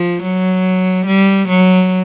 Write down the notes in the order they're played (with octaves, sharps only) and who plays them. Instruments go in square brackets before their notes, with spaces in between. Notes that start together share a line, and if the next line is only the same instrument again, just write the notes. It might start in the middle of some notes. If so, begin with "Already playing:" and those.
Already playing: [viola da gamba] F3
F#3
G3
F#3